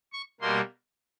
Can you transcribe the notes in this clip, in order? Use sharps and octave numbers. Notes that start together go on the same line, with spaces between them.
C#6
B2 G3 A#3 C6